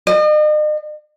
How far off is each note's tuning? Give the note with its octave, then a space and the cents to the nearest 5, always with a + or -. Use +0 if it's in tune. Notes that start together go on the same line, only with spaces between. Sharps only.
D#5 -40